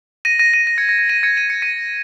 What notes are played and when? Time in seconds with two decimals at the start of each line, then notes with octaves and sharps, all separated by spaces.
0.25 A#6 D#7
0.39 A#6 D#7
0.53 A#6 D#7
0.67 A#6 D#7
0.78 G#6 C#7
0.89 A#6
0.99 A#6
1.09 A#6 D#7
1.23 G#6 C#7
1.37 D#7
1.50 C#7
1.62 A#6 D#7